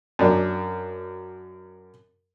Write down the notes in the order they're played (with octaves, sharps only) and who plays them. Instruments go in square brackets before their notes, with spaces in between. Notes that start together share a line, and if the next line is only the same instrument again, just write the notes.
[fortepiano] F#2 D4